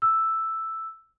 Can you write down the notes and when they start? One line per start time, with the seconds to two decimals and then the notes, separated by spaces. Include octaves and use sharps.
0.02 E6